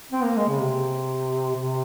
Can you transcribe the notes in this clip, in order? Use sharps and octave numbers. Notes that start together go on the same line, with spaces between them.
C4
A#3
G#3
C#3
C3
C3